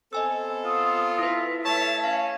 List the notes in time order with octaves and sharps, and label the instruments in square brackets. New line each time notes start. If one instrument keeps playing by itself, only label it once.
[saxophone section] B3 C4 A4 [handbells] D#5 G#5 E6
[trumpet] F4 [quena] D#6
[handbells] E4 B4 [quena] E5
[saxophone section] A3 C#5 [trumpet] A5
[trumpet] C#4 [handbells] F5